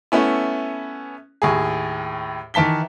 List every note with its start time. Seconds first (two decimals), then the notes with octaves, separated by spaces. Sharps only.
0.12 A3 B3 C#4 E4
1.42 D#2 A2 G#4
2.54 D#3 E3 A5 B6 G7